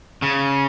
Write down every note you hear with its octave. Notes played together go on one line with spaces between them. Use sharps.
C#3